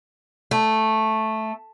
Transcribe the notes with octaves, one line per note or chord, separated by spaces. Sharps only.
A3